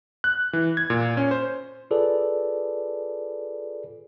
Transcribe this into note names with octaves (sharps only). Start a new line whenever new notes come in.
F#6
E3
G#6
A#2
C#4
C5
F4 G#4 A4 B4 D5